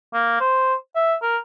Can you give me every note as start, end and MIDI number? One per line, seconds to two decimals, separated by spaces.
0.13 0.36 58
0.40 0.74 72
0.95 1.14 76
1.22 1.37 70